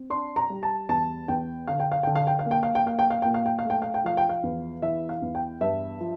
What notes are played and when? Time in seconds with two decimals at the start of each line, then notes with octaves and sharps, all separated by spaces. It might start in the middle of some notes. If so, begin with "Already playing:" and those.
Already playing: C4
0.10 D4 C6
0.36 A#5
0.50 G3
0.63 A5
0.89 E2 A5
1.28 E2 G5
1.68 D3 F5
1.80 G5
1.92 F5
2.03 D3 G5
2.15 F5
2.27 G5
2.39 F5
2.46 A#3
2.51 G5
2.63 F5
2.75 G5
2.86 A#3 F5
2.99 G5
3.10 F5
3.22 A#2 G5
3.34 F5
3.46 G5
3.59 F5
3.65 A3
3.70 G5
3.82 F5
3.94 G5
4.04 F3 F5
4.17 G5
4.29 F5
4.43 E2
4.82 E3 E5
5.09 F5
5.22 E2
5.35 G5
5.61 G2 E5
6.00 F3